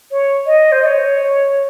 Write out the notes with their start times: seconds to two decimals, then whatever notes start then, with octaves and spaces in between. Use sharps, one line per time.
0.11 C#5
0.46 D#5
0.72 C5
0.82 D#5
0.86 C#5